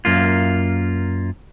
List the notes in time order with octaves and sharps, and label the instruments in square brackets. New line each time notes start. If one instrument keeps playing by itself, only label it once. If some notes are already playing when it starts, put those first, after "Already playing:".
[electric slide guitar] F#2 A#3 F4